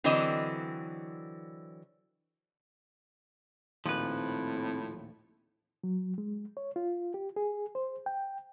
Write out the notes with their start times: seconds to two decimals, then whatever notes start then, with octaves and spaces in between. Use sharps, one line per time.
0.04 D3 E3 F#3 C4 D#5
3.86 A#1 D#2 A2 F3 C4 B4
5.84 F#3
6.18 G#3
6.57 C#5
6.76 F4
7.14 G4
7.36 G#4
7.75 C5
8.06 G5